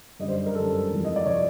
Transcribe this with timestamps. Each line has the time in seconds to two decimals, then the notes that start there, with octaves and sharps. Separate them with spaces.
0.19 F#2 D3 G3 D#5
0.28 C5
0.46 A#4
0.55 F#2 D3 G3 A4
0.90 E2 C3 F3
1.04 D#5
1.16 D5
1.26 C3 F3 C#5